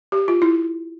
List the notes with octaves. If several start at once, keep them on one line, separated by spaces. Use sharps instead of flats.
G4
F4
E4